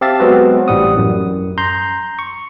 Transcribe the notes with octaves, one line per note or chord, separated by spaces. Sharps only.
C4 G4 E5 F5 A5 A6
F#3 G#3 B3 C4 F#4 B4
A1 A2 G3 F#5 D#6
F#2
A#5 C6 G6
C#6